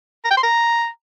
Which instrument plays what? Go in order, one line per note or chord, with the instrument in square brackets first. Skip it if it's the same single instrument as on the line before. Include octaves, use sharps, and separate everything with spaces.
[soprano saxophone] A#5
G5
C6
A#5